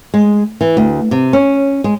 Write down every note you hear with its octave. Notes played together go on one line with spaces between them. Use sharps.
G#3
E3
D2
C3
C#4
G#3